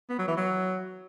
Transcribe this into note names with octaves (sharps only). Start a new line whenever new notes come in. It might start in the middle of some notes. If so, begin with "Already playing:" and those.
B3
F#3
E3
F#3